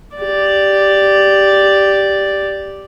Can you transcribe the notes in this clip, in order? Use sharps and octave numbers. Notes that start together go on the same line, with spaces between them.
G4 D5